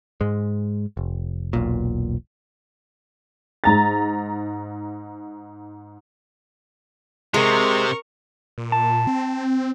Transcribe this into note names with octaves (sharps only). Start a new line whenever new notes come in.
G#2 G#3
F1
E1 B1 A#2
G#2 A#5 A6
C3 G#3 A#4 C#6
A#2
A5
C4